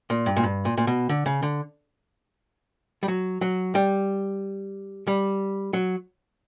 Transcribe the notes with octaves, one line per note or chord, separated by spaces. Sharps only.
A#2
G2
A#2
G2
A#2
A#2
B2
D3
C#3
D3
G3
F#3
F#3
G3
G3
F#3